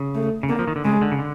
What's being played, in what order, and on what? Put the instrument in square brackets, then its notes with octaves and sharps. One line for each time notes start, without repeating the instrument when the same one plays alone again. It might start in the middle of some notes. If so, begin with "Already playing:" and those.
Already playing: [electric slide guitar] C#3
[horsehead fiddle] A3
[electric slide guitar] C#3
[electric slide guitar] D3 [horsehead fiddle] A#3
[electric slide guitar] F3
D#3
D3
[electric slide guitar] C#3 [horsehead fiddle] G#3
[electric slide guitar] D3
C#3
D3